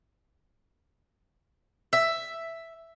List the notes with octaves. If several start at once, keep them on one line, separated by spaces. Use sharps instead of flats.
E5